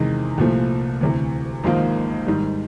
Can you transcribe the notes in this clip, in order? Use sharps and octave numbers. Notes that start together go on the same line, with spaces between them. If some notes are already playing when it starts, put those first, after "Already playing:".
Already playing: E2 C3 D#3 G#3
C2 A#2 F3 A3
D2 C3 E3
G#1 G#2 F3 A#3
G#2 D#3 G3